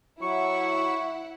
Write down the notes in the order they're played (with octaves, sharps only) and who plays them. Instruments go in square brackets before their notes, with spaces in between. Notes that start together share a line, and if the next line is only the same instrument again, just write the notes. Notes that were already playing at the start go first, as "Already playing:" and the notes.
[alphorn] F#3 [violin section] E4 F#5 [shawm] C#6